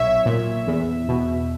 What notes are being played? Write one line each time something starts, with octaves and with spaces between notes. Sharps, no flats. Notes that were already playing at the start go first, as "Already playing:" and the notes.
Already playing: B1 A#2 C#5 E5
A#2
E2
B2